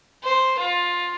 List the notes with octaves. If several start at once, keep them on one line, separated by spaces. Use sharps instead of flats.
C5
F4